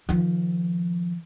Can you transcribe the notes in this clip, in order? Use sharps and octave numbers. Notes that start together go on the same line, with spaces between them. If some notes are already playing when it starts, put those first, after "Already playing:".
D#3 F3